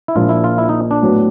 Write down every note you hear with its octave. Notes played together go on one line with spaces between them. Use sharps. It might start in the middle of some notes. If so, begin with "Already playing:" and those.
E4
A#1 A#2 F3 A#3 F4
E4
F4
E4
D#4
D4
A2 F#3 B3